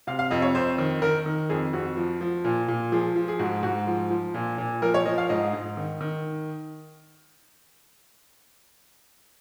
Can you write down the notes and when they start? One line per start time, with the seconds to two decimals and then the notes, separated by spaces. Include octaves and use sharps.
0.07 C3 F5
0.19 F5
0.31 F2 D#5
0.42 C#5
0.54 F2 C5
0.78 D#3
1.02 D#3 A#4
1.26 D#3
1.49 F2 G#4
1.73 F2 F#4
1.97 F3
2.21 F3
2.44 A#2
2.68 A#2
2.92 F3 G#4
3.16 F3
3.28 G#4
3.39 G#2 F#4
3.63 G#2 F#4
3.87 F3
4.10 F3
4.34 A#2
4.58 A#2
4.82 F3 A#4
4.94 C#5
5.06 F3 D#5
5.18 F5
5.29 G#2 D#5
5.53 G#2
5.77 D#3
6.01 D#3